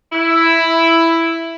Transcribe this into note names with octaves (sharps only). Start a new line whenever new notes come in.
E4